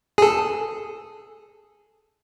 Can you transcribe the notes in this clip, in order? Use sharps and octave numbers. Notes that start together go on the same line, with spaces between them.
G#4 A4